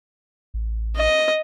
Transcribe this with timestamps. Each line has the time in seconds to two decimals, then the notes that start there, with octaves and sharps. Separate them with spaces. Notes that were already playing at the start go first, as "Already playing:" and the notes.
0.54 A1
0.96 D#5